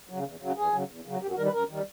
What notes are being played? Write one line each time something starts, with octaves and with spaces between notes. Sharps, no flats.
C#3 F#3
E2
C#3 F#3
E2 G#4
C#3 F#3
E2
C#3 F#3
F#2 G4
F#4
D#3 G3 A#4
B4
F#2 A#4
D#3 G3